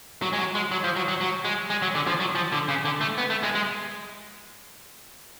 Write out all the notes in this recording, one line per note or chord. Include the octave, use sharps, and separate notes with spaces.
F#3
G#3
F#3
G#3
F#3
F3
F#3
F#3
F#3
G#3
G#3
F#3
D3
F3
F#3
F3
D3
C#3
D3
A3
B3
A3
G#3
G#3